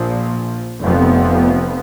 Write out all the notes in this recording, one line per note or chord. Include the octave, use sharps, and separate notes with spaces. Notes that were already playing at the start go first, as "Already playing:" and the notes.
Already playing: A#1 A#2 F3
F1 F2 F3 B3